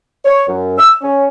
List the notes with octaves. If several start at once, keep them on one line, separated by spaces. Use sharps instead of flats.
C#5
F#2
E6
C#4